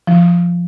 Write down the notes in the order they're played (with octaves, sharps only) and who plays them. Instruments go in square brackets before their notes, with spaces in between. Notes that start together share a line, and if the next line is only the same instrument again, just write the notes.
[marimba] F3